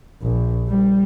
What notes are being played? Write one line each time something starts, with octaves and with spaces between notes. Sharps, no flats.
A#1
G3